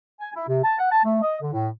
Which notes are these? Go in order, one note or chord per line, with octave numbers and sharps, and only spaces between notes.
G#5
E4
C3
A5
F#5
A5
A3
D#5
D3
A2